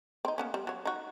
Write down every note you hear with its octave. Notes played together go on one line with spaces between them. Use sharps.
C4 D#4
A#3 B3 C#4
G3
F#3 C#5
D#4 F#4